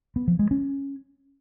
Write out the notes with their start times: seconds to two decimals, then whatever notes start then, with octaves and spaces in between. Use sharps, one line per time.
0.16 B3
0.28 F3
0.39 G#3
0.51 C#4